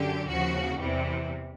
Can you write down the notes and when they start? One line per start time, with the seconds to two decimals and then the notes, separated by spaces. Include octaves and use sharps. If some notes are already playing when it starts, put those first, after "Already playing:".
Already playing: F#2 D3 G4
0.29 D#2 C#3 F3 F#4
0.79 E2 C3 E3 G3